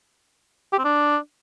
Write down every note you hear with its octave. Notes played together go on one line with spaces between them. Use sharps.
G4
C4
D4